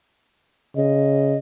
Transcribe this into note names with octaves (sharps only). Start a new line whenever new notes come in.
C#3 D#5